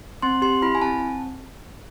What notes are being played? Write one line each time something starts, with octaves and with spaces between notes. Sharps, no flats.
C4 C6
G4 C6
E4 B5
G#5
C4 A5